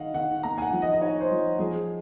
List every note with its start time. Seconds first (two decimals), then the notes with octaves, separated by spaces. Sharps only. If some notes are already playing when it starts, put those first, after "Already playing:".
Already playing: D#3 D#4 D#5 F5 F#5
0.14 D#3 F#5
0.43 A#3 A#5
0.58 G#5
0.62 F#5
0.72 F3
0.82 D#5
0.93 D#5
1.01 D#4 C#5
1.21 C5
1.31 F3
1.59 F3 G#4